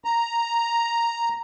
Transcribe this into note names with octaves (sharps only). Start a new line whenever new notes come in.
A#5